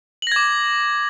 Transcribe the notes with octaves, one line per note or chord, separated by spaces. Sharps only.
D6 G#6 A#6 F#7